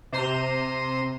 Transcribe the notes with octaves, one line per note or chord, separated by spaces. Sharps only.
C3 C5 A#5 C6 D#7 E7